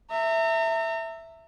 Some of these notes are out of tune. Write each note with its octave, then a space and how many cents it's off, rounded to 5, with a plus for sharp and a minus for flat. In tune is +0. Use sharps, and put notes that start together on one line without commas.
E5 +0 A#5 -40